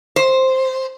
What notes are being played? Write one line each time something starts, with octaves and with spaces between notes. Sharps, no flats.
C5